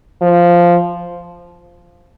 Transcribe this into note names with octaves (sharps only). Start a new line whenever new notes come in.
F3